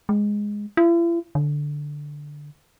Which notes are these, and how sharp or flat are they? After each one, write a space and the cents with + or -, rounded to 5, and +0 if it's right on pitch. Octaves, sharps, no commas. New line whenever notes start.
G#3 -5
E4 +45
D3 +0